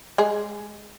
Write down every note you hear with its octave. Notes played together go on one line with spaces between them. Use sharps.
G#3 G#4